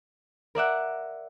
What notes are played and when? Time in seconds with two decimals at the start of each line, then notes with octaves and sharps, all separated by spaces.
0.55 A#4 D5 E5 F#5